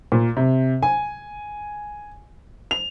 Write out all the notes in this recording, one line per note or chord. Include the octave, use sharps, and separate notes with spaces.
A#2
C3
G#5
F7